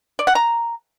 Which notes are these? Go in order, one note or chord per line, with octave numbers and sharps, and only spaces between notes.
D5
F#5
A#5